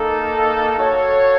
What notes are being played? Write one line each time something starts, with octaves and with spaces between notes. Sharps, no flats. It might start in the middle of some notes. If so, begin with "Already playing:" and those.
Already playing: A#3 D#4 A4
F#4 A4 C#5 F5